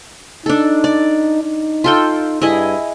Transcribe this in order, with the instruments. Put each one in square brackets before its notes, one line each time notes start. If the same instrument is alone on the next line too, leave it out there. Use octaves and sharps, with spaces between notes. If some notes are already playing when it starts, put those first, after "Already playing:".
[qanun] D4 A4 [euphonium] D#4
[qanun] D5
[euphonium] D#4
[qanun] F4 A4 G5
[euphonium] G2 [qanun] E4 G#4 D#5